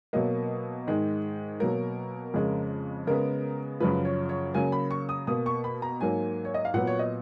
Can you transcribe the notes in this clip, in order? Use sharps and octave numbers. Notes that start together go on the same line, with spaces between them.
B2 F#3 A#3 D#5
G#2 D#3 G#3
B2 F#3 A#3 A#4
F2 C#3 G#3
C#3 G#3 B3 A#4
F#2 C#3 F3 B4
C#5
C#5
C#3 F#3 A#3 G#5
B5
C#6
D#6
B2 A#3 D#6
C#6
B5
A#5
G#2 F#3 A#3 G#5
C#5
D#5
F5
A#2 F#3 B3 F#5
C#5
D#5